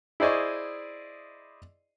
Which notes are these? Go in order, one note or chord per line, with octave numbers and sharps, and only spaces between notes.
E4 G#4 C5 D5 D#5 C#6